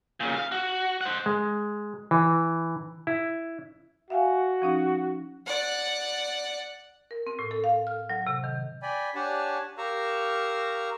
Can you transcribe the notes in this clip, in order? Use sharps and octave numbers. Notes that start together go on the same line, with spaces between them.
A#2 C#3
F5
F#4
C5 F#5
G#3
E3
E4
F#4 E5 F5 G#5
F3 C#4 D#4
D5 F#5
A#4
C4
A2
A4
F5
F6
F#3
C3
D#3
D5 G5 G#5 B5
D4 G4 C#5 F#5 G#5 A5
G4 A#4 F5 A#5 C#6 E6